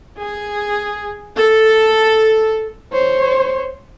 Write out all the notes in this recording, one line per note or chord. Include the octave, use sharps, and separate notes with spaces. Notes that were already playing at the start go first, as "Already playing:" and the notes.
G#4
A4
C5 C#5